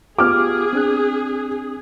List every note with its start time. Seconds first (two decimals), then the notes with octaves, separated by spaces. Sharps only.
0.19 B3 F4 G4 G#4 D6 F6
0.73 C4 D4 F#6